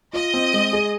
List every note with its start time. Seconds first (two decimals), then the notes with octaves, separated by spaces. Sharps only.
0.13 F4 D#5
0.34 C4
0.53 G#3
0.73 G#4